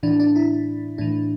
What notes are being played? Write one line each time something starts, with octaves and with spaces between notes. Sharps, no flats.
A2 E3 D4
D4
E4
A2 E3 D4